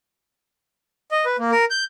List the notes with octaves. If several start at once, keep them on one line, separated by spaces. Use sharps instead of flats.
D#5
B4
A#3
A#4
G6